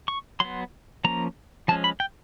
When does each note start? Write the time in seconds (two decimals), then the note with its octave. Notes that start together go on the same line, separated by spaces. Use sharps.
0.08 C#6
0.40 F#3 B3 C6
1.04 F3 A#3 C#4 A#5
1.68 F3 G#3 C#4 A5
1.84 B5
2.00 G5